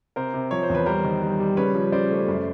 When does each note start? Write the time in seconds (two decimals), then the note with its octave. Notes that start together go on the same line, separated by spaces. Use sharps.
0.16 C3 A#4 C5
0.34 C3
0.51 F3 C#5
0.63 C5
0.69 E2
0.75 B4
0.86 G3 A#4 C5
1.04 D#3
1.22 G3
1.40 G3
1.57 C#3 B4 C#5
1.75 F3
1.92 C#3 C5 D5
2.11 A3
2.28 F#2